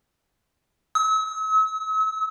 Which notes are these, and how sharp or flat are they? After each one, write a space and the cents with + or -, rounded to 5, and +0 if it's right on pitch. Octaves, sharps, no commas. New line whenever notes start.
E6 -45